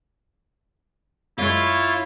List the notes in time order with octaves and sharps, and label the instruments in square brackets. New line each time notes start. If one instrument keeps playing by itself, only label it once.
[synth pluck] F#2 G#3 [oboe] E4 [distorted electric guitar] F4 [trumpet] C#5